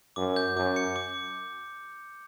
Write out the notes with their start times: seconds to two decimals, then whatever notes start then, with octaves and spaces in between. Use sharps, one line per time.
0.16 F#2 D6
0.36 G6
0.56 F#2 D6
0.76 C#7
0.96 D6